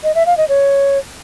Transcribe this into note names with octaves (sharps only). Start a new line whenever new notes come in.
D#5
E5
F5
D#5
C#5